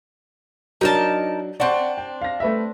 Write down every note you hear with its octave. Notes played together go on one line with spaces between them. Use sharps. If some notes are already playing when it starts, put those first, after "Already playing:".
F#3 D4 D#4 A#4 A5
C4 D4 D5 F#5 C#6
G5
F5 A#6
A3 B4 E5